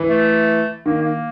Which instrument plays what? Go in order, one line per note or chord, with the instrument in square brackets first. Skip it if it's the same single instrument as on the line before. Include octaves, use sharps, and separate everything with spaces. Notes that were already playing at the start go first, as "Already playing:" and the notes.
Already playing: [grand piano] E3
[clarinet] A3
[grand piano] D#3 [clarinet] A#3
[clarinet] A#3